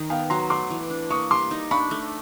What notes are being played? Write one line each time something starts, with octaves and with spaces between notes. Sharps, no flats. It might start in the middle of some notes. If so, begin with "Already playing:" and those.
Already playing: D#3 D#4
B3 F5 G5
F#3 A#5 C6
A3 C6 D6
E3
D4
A#3 C#6 D#6
G3 C6 D6
D#4
D4 B5 C#6
A3